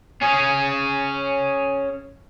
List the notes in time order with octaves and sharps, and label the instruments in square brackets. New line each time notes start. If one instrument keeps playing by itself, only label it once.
[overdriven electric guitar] C#4 G#4